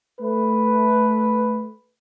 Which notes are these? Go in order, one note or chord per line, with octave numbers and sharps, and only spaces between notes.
A3 B4